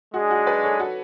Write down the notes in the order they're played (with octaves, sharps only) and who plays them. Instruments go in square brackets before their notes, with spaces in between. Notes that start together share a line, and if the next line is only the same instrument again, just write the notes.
[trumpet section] G#3 D4 G#4 [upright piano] F#4
[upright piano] F#4
B4 D5
A4 C#5
F#4 A4